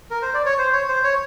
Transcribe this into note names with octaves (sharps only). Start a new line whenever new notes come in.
A#4
C5
D5
C#5
C5
C#5
C5
C#5